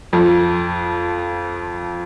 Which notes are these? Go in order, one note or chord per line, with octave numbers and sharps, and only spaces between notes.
F2 F3